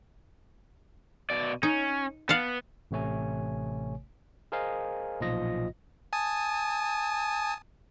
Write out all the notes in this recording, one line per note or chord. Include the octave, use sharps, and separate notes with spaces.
B2 D5
C#4 D#4
B3 F5 F#5 A5
A1 C3 A3 C#5 G#5
G#4 A#4 C5 D#5 F5 G#5
B1 A#2 F3 F4 D#5 A#6
G#5 A5 D#6